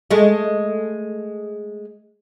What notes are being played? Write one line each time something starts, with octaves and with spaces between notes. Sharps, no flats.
G#3 A3